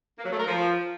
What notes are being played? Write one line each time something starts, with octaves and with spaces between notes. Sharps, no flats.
A#3
F#3
A3
A#4
F3